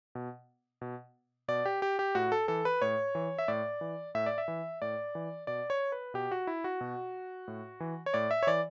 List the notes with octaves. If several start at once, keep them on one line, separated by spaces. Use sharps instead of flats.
B2
B2
B2 D5
G4
G4
G4
A2 F#4
A4
E3 A4
B4
A2 C#5
E3
E5
A2 D5
E3
A2 E5
D5
E5
E3
A2 D5
E3
B2 D5
C#5
B4
B2 G4
F#4
E4
F#4
B2
A2
E3
C#5
A2 D5
E5
C#5
E3 D5